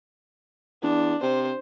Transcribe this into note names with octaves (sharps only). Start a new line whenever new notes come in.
E2 D4
C3 C5